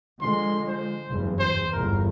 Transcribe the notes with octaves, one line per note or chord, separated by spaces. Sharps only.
D3 F3 G#3 C6
C5
F#1 E2 G2
C5
G1 E2 A#2 A#4